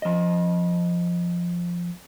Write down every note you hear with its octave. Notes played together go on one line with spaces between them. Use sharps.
F3 D#5